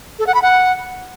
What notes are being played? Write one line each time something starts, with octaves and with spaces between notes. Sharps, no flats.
A4
F#5
B5
F#5